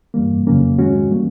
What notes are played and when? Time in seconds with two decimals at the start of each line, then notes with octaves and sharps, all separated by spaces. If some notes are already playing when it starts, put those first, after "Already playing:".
0.14 G2 E3 G3 A#3
0.47 F2 C#3 F#3 A#3 C#4
0.79 G#2 D#3 G#3 C#4 F#4
1.11 E3 G3 A#3